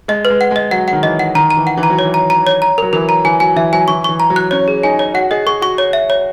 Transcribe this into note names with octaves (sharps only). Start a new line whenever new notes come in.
G#3 D#5
B4
G#3
F#5
G#3 D#5
F#3 F#5
D#3 F#5
E3 D#5
F#5
D#3 A#5
A#5
E3
F#5
E3
A#5
F#3
E3 C#5
A#5
A#5
C#5
A#5
F#3 A#4
E3 A#4
A#5
E3 G#5
F#3 G#5
E3 E5
F#3 G#5
E3 C#6
E3 C#6
A#5
F#3
F#6
C#4 C#5
G#4
D#4 G#5
C#5
F#4 F#5
G#4 D#5
G#4 C#6
F#4 C#6
C#5
E5
C#5